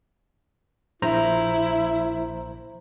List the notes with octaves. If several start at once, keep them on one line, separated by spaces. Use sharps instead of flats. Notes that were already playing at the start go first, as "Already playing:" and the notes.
A#1 E4 C5 A#5